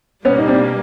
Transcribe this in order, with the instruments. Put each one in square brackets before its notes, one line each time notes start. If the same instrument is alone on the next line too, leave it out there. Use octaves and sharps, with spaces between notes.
[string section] B2 G3 A#3 [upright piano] B3 C#4
[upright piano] D#4
C4 D4